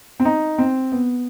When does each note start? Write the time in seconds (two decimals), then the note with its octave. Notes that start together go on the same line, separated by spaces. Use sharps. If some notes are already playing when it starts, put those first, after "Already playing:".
0.20 C4
0.25 D#4
0.58 C4
0.92 B3